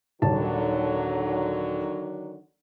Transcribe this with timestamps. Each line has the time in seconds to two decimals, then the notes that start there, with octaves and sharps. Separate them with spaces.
0.22 D#1 D3 D#3 F#3 C#5 A5